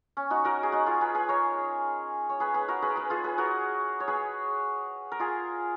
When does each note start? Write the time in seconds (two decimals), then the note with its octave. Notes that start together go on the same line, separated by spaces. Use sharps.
0.17 C#4
0.30 D#4 F#4
0.45 F#4 A#4
0.63 G#4
0.72 D#4 F#4
0.86 F4 G#4
1.01 G#4 B4
1.15 G#4 B4
1.29 A#4 C#5
2.29 C#5
2.40 G#4 B4
2.54 G#4 B4
2.68 F#4 A#4
2.82 G#4 B4
2.90 A#4
2.96 G#4 B4
3.10 F4 G#4
3.24 G#4 B4
3.38 F#4 A#4
4.00 C#5
4.08 G#4 B4
5.12 A#4
5.19 F4 G#4